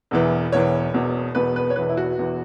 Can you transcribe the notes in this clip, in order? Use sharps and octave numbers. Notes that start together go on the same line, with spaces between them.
E1 E2 E3
E1 E2 E3 C#5
E1 E2 B2
E1 E2 B2 B4
B4
C#5
E1 E2 E3 B4
E4
F#4
E1 E2 E3